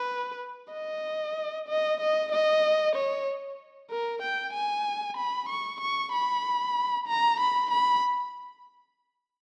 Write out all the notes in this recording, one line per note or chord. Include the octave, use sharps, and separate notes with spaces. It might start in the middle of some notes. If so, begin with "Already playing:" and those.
Already playing: B4
D#5
D#5
D#5
D#5
C#5
A#4
G5
G#5
B5
C#6
C#6
B5
A#5
B5
B5